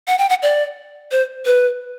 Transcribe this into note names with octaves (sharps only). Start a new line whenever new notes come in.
F#5
G5
F#5
D5
C5
B4